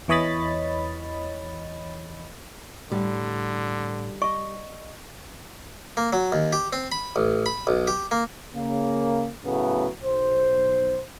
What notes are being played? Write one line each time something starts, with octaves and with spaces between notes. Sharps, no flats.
E2 E3 C#5 D#5 B5 A6
A2 D3 G3
D5 D#5 C#6
A#3
F#3
D#2
G4
C4
B5
A1
B5
B1
G4
A#3
C#3 A#3
A2 C#3 F#3 A3 B3
B1 C5